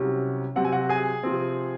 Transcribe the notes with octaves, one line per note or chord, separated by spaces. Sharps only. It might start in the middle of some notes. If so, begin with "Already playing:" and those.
Already playing: C2 C3 F#3 C#4
C3 F#3 C4 F#5
G#5
F#4 F#5
G#4 G#5
C3 F3 C4